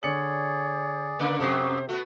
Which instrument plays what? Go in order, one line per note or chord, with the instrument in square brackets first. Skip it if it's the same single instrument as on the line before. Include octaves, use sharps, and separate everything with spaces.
[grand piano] D3 C#7 F#7 [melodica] G#4 D5 [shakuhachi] C#5
[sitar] C#3 A#3 D5 [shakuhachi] B4 [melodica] D6
[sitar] F2 F#3 A4 [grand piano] C3 [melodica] B3 G4 [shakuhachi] C5
[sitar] A3 B3 [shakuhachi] F#4